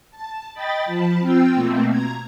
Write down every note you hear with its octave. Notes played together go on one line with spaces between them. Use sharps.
A5
D#5 G5 B5 A6
F3 A5 B5
C4 F4 G5 E6
B2 A3 A#3 C4
A#5 G#6